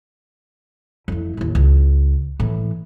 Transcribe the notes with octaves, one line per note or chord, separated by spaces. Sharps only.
F2 E3
A1 D#2
C#2
A2 E3